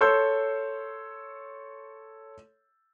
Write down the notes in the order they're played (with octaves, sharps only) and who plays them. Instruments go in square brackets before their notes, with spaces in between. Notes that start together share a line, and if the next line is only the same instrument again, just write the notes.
[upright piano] A4 C#5 C6 E6 G6